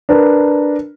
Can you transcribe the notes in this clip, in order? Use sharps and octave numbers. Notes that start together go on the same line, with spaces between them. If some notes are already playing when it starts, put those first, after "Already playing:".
D4 A#4 B4